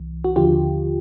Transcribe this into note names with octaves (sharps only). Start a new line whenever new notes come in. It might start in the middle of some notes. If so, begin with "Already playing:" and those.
Already playing: C2 E3
F#4
D#2 D3 F3 F4 G4